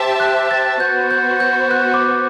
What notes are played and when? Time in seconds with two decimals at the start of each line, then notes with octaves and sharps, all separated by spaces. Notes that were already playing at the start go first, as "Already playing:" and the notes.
Already playing: G4 C5 E5 A5
0.20 F#6
0.51 A6
0.80 B3 F#4 C5 G6
1.11 G6
1.40 G6
1.71 F#6
1.94 D6